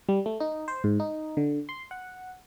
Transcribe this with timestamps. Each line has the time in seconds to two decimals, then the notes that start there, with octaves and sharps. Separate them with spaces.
0.09 G3
0.26 A3
0.40 D#4
0.68 C5
0.84 G#2
1.00 D#4
1.37 D3
1.69 C6
1.91 F#5